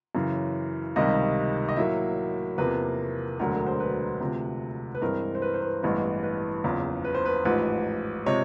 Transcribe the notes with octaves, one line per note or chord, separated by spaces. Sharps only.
F#2 C#3 E3
C#2 C3 D#3 G3 D#5
D#5
A2 F#3 A#3 E5
E2 C3 F3 A#3 B4
E1 D2 D3 F#3 A#4
A#4
C5
B4
D2 C3 F3
B4
G2 E3 G#3 C4 A#4
C5
B4
C5
B4
A1 G2 E3 G#3 B3
B4
F#1 E2 C#3 F3
B4
C5
B4
A1 G#2 F3 B4
C3 F3 G#3 C#5